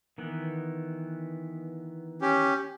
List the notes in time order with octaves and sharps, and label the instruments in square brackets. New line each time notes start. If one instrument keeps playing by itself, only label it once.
[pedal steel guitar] D#3 E3 B3
[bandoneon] C#4 G4